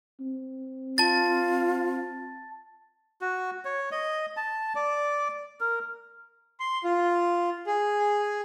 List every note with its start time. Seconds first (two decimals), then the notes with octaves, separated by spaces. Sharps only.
0.20 C4
0.98 F4 A5 A6
3.21 F#4
3.65 C#5
3.92 D#5
4.37 A5
4.76 D5
5.61 A#4
6.60 C6
6.84 F4
7.67 G#4